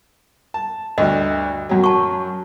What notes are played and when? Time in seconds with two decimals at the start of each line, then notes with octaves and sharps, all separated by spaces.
0.54 A5
0.98 D2 G2 D#5
1.69 F#2 F#3
1.84 A5 C#6